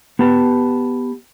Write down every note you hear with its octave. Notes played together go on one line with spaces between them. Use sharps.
B3 G4 A5